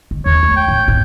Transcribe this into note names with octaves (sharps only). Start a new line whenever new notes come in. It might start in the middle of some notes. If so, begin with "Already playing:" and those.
D#3
D#2 C#5
A3
G5
A2
G#2 B2